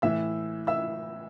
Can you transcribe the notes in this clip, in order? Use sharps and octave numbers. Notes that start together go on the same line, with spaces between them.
A2 E3 E5 E6
E5 E6